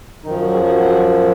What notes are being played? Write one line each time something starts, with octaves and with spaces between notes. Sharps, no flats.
F#2 D#3 F3 D#4
F#3 F#4
G#4
F#3 F#4
F#3 F#4